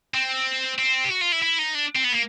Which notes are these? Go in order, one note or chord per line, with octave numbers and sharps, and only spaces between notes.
C4
C4
G4
F#4
F4
E4
E4
D#4
D4
C4
B3
A#3